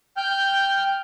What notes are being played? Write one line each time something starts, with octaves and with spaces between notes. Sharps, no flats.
G5 F6 G6